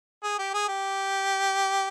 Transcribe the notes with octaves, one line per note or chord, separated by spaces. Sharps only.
G#4
G4
G#4
G4